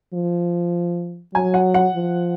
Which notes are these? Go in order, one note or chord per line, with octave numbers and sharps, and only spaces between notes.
F3
F#3 G#5
F#5
F#5
F3